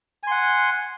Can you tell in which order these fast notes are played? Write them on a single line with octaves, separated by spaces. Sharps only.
G#5 C6 F#5